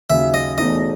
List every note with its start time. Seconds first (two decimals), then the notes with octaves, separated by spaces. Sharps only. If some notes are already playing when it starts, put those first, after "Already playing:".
0.10 D#2 C#3 F#3 E5
0.34 D#5
0.58 E1 E2 B2 A3 D#4 D#5